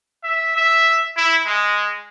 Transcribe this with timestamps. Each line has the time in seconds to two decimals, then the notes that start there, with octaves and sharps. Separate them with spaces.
0.24 E5
0.56 E5
1.17 E4
1.46 G#3